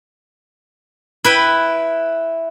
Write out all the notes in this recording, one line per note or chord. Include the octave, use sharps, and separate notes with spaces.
E4 B4 G5